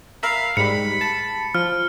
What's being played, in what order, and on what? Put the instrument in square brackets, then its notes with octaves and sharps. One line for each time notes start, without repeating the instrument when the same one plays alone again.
[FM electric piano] A#4 E5 B5 [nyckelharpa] F5
[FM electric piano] G#2 G3 [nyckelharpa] B5 [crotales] C#7
[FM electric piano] A5
[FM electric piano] F3 [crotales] F6